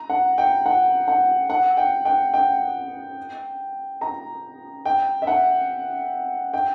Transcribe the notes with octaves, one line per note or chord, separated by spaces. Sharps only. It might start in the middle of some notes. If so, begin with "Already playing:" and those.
Already playing: A#5
F#5
G5
F#5
F#5
F#5
G5
G5
G5
A#5
G5
E5
F#5
G5